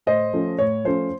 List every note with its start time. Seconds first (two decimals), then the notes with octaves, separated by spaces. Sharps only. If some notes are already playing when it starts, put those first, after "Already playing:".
0.06 A2 C5 D#5
0.33 F3 A3 C#4
0.59 A2 C#5
0.85 F3 A3 C#4 C5